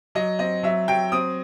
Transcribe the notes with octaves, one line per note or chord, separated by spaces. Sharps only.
F#3 D#5
C4 D#5
F#3 E5
F#3 G5
C4 D#6